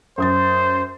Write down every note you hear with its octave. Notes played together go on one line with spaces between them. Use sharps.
F#2 C5 D#6 A6